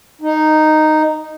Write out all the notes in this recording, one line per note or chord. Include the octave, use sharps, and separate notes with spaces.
D#4